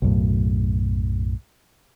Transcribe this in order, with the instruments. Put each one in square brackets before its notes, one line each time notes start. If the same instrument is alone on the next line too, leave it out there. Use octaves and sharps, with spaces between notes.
[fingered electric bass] B1 F#2 A2